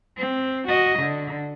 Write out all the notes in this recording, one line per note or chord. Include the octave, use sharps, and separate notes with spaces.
C4
F#4 D#5
D3